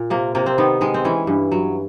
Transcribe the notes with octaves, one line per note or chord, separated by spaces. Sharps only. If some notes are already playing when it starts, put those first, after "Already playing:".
Already playing: A#2
C3 A#3
C3 A#3
C4
D#3 B3
D#3 G#3
C4
E3 C#4
G2
F#3